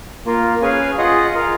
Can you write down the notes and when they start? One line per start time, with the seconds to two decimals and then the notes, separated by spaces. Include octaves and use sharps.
0.26 A#3 F4 A#4
0.62 C#4 G#4 B4 F5 G#5
0.98 F4 G#4 D#5 F#5
1.34 F4 A#4 F5